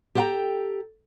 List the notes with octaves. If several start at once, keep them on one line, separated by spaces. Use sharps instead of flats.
G4 A4 C5 F#5 G5 A#5